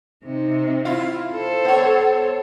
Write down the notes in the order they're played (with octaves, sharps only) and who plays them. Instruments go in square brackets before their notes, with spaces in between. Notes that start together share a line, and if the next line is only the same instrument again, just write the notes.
[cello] C3 D#4
[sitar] E4 F4
[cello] A4 C5
[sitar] B3 C#5